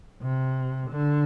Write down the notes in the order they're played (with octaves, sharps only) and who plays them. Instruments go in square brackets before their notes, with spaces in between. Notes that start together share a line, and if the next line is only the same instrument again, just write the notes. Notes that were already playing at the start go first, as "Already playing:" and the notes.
[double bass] C3
D3